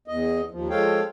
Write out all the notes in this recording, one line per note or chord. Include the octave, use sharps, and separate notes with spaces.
E2 D#5
D#2 F3
F3 G#3 A4 C#5 F5 G5